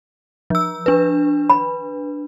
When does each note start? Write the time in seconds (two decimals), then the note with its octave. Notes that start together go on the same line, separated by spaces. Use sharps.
0.50 F3 E6
0.86 D4 B4
1.50 B5